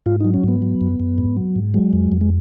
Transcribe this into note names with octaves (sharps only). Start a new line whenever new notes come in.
G#2 F4
F#3 D#4
C#4
G#2 B3
F#3
F#2
F#2
G#2
F#3
G#2
F#3 G#3
F2
F2
G#3